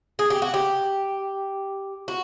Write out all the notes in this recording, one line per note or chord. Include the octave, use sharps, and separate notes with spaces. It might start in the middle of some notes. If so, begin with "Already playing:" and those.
G#4
G4
F#4
G4
F#4